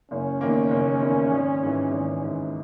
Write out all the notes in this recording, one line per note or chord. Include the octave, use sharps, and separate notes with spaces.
F#1 C#4
E2 D#3 A#3
F#1
E2 D#3 A#3
G#1
G#2 E3
G#1
G#2 E3